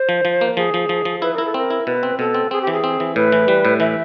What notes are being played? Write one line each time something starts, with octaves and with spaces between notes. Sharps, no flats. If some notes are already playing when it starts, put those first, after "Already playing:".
Already playing: C5
F3
F3
A#3
F3 G#4
F3
F3
F3
E4 B4
E4 A#4
A4
C4 A#4
E4
B2 B4
C4
B2 A4
C4
C4 G#4
G4
E3
G#4
C4
E3
A2 B4
E3
G3
A2
E3 E5